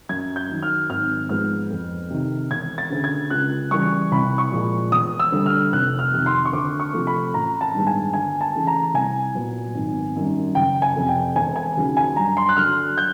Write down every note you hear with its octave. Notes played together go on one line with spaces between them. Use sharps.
F#2 G#6
G6
D#3 F#3
F6
G#1 F6
G#2 F3 G#3 B3 F6
F2
C3 D#3
E1 G#6
A6
D2 C#3
G#6
C#2 F#6
C#3 E3 G3 C#6
C2 B5
C#6
A#2 F3 G#3
E1 D#6
E6
D2 D3 G3
F6
F1 F#6
F6
F2 C3 D#3
C6
C#6
D2 D6
C#6
C3 F3 A3
B5
A1 A#5
A5
G2 D#3 G#3 B3
G#5
D2 G#5
A5
C#3 E3 A3
A#5
C2 G#5
A#2 F#3 B3
G#1
F#2 D#3 G3
F#1 G5
G#5
F2 C3
G5
E1 G#5
G#5
D#2 C#3 F#3
G#5
G2 A#5
C6
F#6
D3 F#3 F6
G6